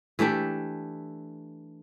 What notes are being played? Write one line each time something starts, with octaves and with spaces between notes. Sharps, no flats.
E3 A3 D4 G4